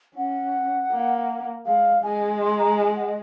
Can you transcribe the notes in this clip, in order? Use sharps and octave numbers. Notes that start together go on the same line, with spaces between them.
C#4 F#5
A#3
G#3 F5
G#3 G#5
C6
A#5
G#5
F#5
D#5